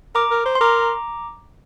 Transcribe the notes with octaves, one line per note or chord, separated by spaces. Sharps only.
A#4 A#5 D6
A#4
C5
C6
A#4 A#5 D6